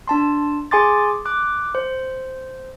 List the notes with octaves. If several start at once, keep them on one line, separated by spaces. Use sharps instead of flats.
D4 A5 C6
G#4 G#5 C6 D6 A6
D6 F#6
C5